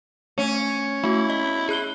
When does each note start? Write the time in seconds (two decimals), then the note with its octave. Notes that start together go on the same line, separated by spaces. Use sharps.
0.38 A3 C#4
1.04 A3 E4 F#4
1.30 D#5
1.69 G#4 F#6 G7